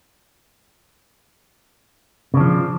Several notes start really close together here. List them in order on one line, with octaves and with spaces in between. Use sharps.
C#3 D4 F3